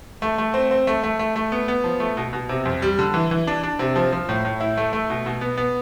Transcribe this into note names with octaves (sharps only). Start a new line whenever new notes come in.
A3
A3
C4
C4
A3
A3
A3
A3
B3
B3
F3
A3
B2
B2
C3
F2
G3
D3
E3
E3
D4
D4
C3
F3
F3
A2
A2
E4
A3
A3
B2
B2
B3
B3